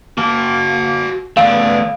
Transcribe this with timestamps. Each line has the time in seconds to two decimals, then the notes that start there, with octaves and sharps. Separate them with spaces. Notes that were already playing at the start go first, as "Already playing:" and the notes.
0.18 A#3 F#4 A5
1.37 C#2 A3 B3 D5 F5